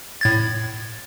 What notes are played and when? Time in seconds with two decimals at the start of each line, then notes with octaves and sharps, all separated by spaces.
0.21 A2 G#6 A6